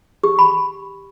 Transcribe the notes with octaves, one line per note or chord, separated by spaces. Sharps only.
G4
B5